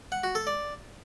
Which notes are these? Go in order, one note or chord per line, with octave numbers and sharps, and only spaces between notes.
F#5
F#4
A4
D5